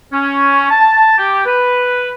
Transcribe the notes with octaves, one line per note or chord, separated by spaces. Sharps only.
C#4
A5
G4
B4